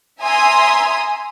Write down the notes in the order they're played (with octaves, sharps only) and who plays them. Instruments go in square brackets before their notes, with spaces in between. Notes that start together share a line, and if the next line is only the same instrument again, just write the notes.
[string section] E5 G#5 A#5 C6 D#6 E6